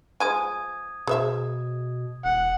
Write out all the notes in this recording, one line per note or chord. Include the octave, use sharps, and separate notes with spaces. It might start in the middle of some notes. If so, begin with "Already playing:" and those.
F3 G#3 G#5 D#6 G#6 D#7
B2 G#4 C5 E5
E1 F#5